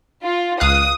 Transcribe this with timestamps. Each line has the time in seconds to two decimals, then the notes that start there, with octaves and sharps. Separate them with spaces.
0.24 F4
0.60 C#2 F5 D#6 F#6